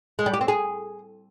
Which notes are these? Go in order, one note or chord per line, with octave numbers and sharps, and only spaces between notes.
G#3
G3
G4
C4
G#4